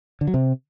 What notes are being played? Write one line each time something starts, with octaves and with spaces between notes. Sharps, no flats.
D3
F#3
C3